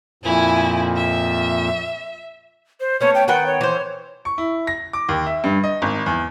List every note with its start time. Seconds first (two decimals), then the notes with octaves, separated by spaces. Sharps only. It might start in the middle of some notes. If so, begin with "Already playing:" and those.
0.24 F2 A#2 E4 G#5
0.96 E5
2.80 C5
3.01 A3 B3 C#4 C#5
3.15 G5
3.28 D#3 B3 F#5 G5
3.46 C#5
3.61 E3 C5
4.25 C#6
4.38 E4
4.67 A#6
4.93 D6
5.09 D#2
5.26 E5
5.44 G2
5.64 D#5
5.82 G#1
6.06 E2